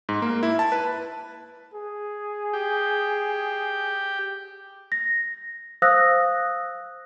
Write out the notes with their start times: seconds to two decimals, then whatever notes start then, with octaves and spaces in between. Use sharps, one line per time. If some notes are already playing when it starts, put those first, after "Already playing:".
0.09 G#2
0.22 A#3
0.43 E4
0.59 A5
0.72 B4
1.74 G#4
2.53 G4
4.92 A#6
5.82 C5 F5 D#6 E6 F#6 A#6